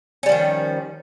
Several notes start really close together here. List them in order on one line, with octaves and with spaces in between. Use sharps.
C#4 G3 F3 D#3